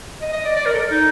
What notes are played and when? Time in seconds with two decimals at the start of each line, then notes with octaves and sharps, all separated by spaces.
0.21 D#5
0.33 D#5
0.45 D5
0.56 D5
0.65 A#4
0.73 A4
0.91 D#4